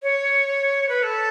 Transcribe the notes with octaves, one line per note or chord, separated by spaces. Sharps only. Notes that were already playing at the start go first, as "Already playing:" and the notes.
C#5
B4
A4